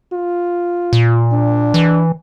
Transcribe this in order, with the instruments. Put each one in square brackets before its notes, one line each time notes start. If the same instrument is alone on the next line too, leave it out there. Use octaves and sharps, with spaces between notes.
[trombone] F4
[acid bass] A#2
[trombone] D4
[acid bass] E3